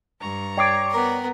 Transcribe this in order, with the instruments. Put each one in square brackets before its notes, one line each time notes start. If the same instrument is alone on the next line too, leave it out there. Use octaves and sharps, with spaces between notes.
[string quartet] G2 A#5 C#6
[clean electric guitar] C#5 D5 [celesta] G5 C7 D7
[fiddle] B3 A#4